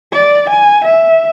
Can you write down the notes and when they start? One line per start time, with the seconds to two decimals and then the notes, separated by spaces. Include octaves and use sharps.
0.12 D5
0.50 G#5
0.85 E5